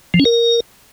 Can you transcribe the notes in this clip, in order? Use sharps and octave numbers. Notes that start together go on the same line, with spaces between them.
F3
C#4
A#4